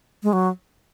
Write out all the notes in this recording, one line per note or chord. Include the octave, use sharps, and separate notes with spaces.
G#3
F#3